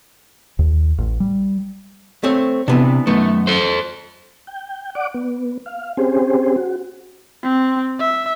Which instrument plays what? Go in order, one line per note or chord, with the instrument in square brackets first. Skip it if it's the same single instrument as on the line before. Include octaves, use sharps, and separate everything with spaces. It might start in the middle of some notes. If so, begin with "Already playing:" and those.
[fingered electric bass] D#2
A1
G3
[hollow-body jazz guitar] A3 C4 C#5
[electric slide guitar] C3 [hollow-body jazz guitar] E3 B3 D4
[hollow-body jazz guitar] F#2 D#3 B3 [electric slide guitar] A3
[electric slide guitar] A4 C5
[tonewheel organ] G5
D5 F#5 D6
B3
F5
C4 C#4 G4 G#4 C5
F#4
[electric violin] C4
E5